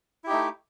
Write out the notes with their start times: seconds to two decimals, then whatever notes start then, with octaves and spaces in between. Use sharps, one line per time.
0.24 E4
0.27 G4
0.30 D#4
0.33 A3